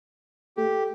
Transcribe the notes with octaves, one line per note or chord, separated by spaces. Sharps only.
A3 G4